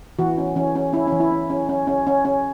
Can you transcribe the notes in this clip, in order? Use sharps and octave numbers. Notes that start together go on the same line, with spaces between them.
E3 F#4
C#4
E3 C#4
C#4
C#4 E4
C#4
E3
E4
C#4
C#4
C#4
C#4
C#4
C#4